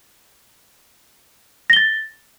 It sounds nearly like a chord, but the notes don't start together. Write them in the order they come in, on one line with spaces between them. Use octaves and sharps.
A#6 G7 A6